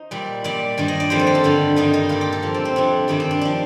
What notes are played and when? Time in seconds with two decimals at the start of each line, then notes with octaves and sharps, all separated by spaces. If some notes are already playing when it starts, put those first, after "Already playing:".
Already playing: D#4 C5
0.11 A#2 G3
0.44 A#2 G3 D5
0.78 G2 D#3 G3
0.88 D#5
1.00 D5
1.10 F2 D#3 G3 C5
1.19 A4
1.27 G4
1.35 F4
1.44 G2 D3 G3
1.76 G2 D#3 G3 D#4
1.93 D#4
2.09 A#2 G3 F4
2.21 G4
2.32 A4
2.42 A#2 F3
2.54 C4
2.65 C4
2.76 F2 C3 G3 D4
3.08 G2 D#3 G3 D4
3.20 C4
3.31 D4
3.41 F3 D4